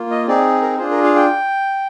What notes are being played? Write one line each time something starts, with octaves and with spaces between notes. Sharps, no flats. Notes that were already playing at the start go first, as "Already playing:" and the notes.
Already playing: A#3 F4
D#5
C4 D#4 G#4 D5
A#4
D4 F4 G#4 C5
A#4
F5
G5